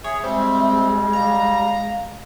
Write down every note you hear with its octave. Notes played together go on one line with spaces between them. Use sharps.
G#4 C#5 E5
G3 G#3 C4
F5 A#5